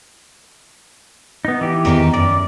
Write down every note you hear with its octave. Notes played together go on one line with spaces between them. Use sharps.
B3 D#4
E3 G4
E2 D#3 D#4
F#2 D5